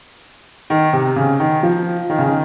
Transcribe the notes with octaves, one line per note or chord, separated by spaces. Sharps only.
D#3
C3
C#3
D#3
F3
D#3
C#3
D#3